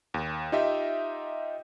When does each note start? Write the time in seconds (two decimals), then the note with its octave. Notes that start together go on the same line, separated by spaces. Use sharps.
0.14 D#2
0.52 D#4 F4 G4 D#5 E5